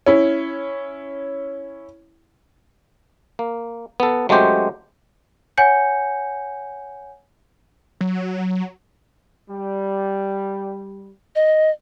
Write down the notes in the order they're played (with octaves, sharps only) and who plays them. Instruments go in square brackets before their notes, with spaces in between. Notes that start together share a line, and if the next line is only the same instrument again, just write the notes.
[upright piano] C#4 E4
[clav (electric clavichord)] A#3
B3 A4
F#3 G#3 A3 C#4 G4 C5
[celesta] C#5 F#5 G#5 G6 C#7
[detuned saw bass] F#3
[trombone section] G3
[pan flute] D#5